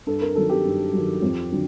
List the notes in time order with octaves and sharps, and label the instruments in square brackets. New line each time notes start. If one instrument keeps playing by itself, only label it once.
[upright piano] G2 A4
A#4
D#3 F#3 A4
G4
G2
D#3 F#3
F2
D3 F#3